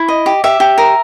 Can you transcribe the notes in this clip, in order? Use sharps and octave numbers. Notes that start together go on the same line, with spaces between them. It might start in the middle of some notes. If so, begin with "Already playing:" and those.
Already playing: E4
D#5
G4
G4 E5
G4
A#4